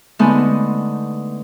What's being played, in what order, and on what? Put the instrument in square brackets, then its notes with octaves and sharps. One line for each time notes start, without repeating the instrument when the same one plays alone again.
[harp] D3 G#3 A3 B3 C4 D#4